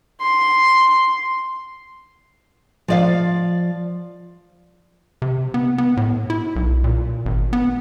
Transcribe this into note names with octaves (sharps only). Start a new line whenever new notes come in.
C6
F3 D5 F5
C3
B3
B3
A2
E4
B1
A#2
G#1
B3